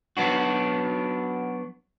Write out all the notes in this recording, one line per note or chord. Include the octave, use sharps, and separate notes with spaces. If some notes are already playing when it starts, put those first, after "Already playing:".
F#3 B3 D4 F#4